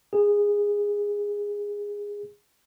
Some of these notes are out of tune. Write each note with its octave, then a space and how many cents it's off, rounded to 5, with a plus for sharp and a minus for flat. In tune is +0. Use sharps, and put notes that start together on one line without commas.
G#4 -15